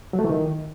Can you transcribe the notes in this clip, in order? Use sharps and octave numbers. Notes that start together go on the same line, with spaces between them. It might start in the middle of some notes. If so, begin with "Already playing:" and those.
F#3
A3
E3
D#3